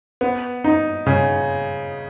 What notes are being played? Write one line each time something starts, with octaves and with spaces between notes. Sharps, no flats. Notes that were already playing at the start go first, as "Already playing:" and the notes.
B3
D#4
C#3